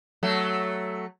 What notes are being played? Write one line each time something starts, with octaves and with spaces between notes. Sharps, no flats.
F#3 A3